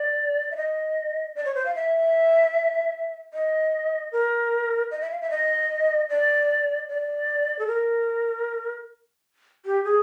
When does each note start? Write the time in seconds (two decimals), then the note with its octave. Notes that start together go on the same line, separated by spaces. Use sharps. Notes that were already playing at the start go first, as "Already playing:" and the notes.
Already playing: D5
0.51 E5
0.56 D#5
1.35 D5
1.45 C#5
1.55 C5
1.65 F5
1.75 E5
3.33 D#5
4.12 A#4
4.91 D#5
5.01 E5
5.11 F5
5.21 E5
5.30 D#5
6.10 D5
6.89 D5
7.59 A4
7.67 A#4
9.66 G4
9.84 G#4